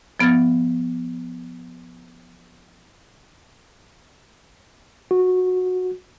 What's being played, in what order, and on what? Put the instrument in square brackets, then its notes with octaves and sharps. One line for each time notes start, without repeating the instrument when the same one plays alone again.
[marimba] F3 B3 F6 G#6 A6
[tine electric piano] F#4